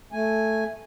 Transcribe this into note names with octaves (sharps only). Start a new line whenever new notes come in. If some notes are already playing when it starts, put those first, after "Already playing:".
A3 G#5